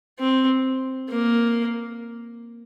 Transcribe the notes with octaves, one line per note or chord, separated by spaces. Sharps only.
C4
A#3